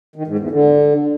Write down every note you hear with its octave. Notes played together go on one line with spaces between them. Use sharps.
D#3
G#2
E2
D3